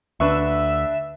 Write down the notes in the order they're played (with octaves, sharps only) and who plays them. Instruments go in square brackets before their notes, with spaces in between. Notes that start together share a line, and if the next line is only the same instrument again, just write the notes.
[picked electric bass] D2 [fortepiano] D4 B4 C#6 [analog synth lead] E5